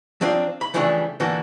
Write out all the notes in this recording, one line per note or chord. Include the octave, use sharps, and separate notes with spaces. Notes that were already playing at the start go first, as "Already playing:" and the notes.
F3 F#3 C4 D4 F4
B5
C#3 E3 F3 G3 A3 D4
A#2 D3 E3 F#4 A4